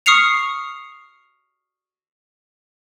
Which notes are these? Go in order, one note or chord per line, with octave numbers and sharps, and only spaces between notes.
C#6 D#6 F6 C7 C#7 F7